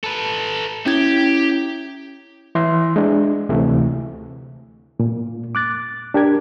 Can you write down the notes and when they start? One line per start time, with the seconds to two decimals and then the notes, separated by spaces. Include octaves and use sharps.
0.04 A4 B4
0.86 C#4 E4 G4 G#6
2.55 E3 E5 C6
2.96 G#3 D4
3.49 D2 C3 E3 A3
5.00 A#2
5.55 D6 F#6 A6
6.14 D4 G4 A#4 G#6